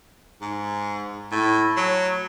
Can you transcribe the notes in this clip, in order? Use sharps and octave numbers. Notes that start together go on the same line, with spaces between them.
G#2
A2
F#3